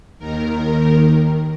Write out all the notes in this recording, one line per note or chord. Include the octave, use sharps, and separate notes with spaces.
D#2 D#3 A#4